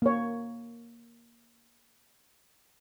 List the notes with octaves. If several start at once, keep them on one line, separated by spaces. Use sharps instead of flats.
A#3 C#5